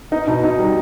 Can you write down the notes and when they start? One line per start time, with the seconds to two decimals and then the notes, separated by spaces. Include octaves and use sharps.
0.11 B3 D#4
0.27 B2 D#4
0.43 B2 D#4
0.59 G3